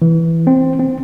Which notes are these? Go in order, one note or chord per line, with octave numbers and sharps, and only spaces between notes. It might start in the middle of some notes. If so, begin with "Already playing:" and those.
E3
C4
C4